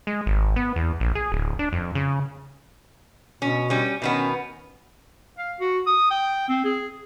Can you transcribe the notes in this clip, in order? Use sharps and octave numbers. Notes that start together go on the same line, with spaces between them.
G#3
G#1
B3
E2
A#1
G#4
D1
D4
F2
C#3
B2 C#4
G3 C#4
B2 D#3 B3 C#4
F5
F#4
D#6
G5
C4
G#4